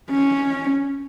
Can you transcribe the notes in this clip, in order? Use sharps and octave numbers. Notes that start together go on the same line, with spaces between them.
C#4